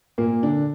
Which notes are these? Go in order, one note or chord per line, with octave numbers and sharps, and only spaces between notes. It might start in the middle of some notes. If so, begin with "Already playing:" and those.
A#2 A#3
D3 D4